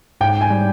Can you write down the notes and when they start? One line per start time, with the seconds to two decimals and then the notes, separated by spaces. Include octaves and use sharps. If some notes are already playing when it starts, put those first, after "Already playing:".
0.21 G#2 G5
0.41 G#5
0.51 G3